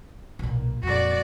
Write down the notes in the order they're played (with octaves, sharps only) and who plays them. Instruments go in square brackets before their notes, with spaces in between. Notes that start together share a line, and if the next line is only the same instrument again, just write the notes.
[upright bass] B1 A#2
[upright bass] F2 A#2 [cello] F#4 D5